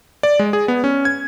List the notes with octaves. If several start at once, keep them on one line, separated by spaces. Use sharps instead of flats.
D5
G#3
G#4
B3
C#4
G#6